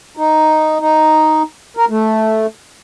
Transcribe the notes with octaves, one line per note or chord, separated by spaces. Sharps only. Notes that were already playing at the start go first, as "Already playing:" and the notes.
D#4
D#4
A#4
A3